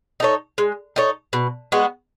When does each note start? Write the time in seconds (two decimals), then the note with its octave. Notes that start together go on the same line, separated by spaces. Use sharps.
0.20 D#4 A4 C#5
0.58 G#3
0.96 D#4 A4 C#5
1.33 B2
1.72 G#3 B3 F#4